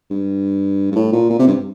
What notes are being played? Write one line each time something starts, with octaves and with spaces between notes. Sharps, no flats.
G2
G2
A2
A#2
A#2
C3
G2